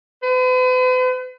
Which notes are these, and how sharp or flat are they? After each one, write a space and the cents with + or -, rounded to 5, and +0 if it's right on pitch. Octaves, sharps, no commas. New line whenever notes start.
B4 +45